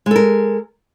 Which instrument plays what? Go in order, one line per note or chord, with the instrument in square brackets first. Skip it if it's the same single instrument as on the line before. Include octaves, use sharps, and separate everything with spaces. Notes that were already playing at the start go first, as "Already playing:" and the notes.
[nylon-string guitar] G#3
A4
A#4